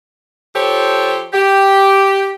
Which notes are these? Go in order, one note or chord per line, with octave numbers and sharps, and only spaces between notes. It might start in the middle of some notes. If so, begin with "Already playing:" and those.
F3 G4 A4 C5 C#5
G4